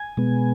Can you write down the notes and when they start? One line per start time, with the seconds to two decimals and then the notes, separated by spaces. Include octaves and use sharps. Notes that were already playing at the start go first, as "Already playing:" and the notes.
Already playing: G#5
0.17 B2 G#3 B3